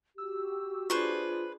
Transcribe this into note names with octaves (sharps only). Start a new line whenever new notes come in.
F#4 G4 E6
D4 F4 G#4 B4 C5 C#6